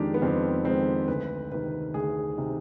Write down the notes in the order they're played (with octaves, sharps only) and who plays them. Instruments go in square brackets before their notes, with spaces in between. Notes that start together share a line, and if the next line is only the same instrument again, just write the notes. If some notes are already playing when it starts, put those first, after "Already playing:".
Already playing: [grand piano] F2 D#3 G#3 D4 G4
B3
F2 C4
D#3 G#3 C4
D2 B4
C3 D#3 B4
D2 G#4
C3 D#3